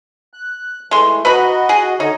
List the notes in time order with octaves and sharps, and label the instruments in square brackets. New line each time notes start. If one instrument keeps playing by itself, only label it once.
[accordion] F#6
[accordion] E3 A3 [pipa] G#3 C6
[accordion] F#4 D#5 [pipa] B4 A#5 B5
[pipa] G#4
[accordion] D3 C#5 D#5 [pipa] D#4